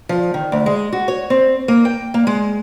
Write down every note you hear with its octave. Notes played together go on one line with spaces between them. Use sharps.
F3
D#3
D2
G#3
F#4
C#5
C4
A#3
G5
A#3
G#3